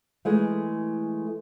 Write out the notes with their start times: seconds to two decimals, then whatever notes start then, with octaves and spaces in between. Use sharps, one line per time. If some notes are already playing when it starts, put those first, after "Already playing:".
0.25 E3 G#3 A3